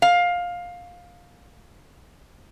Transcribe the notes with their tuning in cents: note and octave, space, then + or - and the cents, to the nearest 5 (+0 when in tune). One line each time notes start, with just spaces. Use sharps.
F5 +15